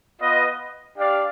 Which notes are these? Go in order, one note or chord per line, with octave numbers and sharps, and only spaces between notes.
B3 F4 B4 D#5
D4 G4 D5 F5